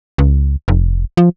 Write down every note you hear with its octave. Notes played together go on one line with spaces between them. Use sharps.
C#2
F1
F3